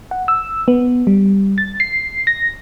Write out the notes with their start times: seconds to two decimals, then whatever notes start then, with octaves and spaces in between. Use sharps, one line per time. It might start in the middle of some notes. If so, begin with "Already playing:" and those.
0.11 F#5
0.28 E6
0.68 B3
1.07 G3
1.58 A6
1.80 C7
2.27 A#6